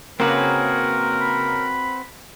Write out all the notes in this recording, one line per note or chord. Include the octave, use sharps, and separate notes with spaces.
C#3 A#3 C4 F#4 G#4 A#4 B4
B5